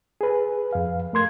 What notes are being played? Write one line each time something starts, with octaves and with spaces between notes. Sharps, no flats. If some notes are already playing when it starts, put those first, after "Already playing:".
G#4 B4
F2 F5
A3 A#4 C6 G#6